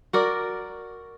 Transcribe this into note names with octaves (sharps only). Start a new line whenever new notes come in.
F#4 A#4 D5